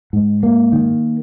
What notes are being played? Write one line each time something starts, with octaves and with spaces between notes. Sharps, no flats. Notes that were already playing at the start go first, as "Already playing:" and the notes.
G#2
A#3
D#3